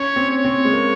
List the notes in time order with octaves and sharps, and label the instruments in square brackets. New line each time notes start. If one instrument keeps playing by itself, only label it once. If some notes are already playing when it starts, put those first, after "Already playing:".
Already playing: [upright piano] C#4 [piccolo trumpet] C#5
[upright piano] C4
[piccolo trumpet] C#5
[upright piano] C4
G#3
A#3